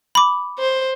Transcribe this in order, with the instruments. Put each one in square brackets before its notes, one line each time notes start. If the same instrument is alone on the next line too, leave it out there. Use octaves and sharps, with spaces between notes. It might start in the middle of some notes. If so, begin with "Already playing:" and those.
[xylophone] B5 D6
[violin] C5